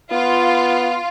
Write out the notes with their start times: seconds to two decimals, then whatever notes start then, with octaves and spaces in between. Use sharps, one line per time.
0.12 B3 F4